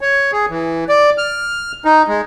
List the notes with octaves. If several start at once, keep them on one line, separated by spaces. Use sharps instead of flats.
C#5
G#4
E3
D5
F6
D#4
G#3